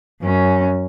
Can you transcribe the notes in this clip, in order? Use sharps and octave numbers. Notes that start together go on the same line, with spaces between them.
F#2 C#4